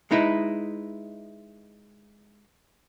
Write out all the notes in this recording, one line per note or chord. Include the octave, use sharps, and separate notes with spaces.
G#3 D#4 E4 B4